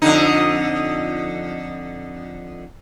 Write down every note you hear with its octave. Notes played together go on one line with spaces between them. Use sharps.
F2 D3 D#4